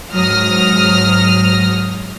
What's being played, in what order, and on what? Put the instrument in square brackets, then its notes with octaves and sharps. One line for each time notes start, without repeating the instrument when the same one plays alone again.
[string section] G#2 F#3 D#6 F6 A#6